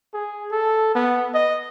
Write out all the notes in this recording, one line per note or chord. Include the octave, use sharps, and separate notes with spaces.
G#4
A4
B3
D#5